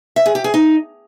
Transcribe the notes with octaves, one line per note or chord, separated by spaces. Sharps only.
E5
G#4
G4
G#4
D#4